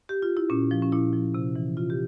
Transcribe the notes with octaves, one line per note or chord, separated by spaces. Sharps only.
G4
F4
E4
A#2 C#4
F3
C#4
A#2 E4
F3
C3
E3
C3 F4
G4